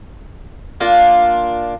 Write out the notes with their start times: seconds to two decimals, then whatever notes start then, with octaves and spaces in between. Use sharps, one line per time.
0.80 A#3 D4 F4